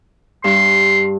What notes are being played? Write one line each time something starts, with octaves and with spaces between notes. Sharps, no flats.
G2 C6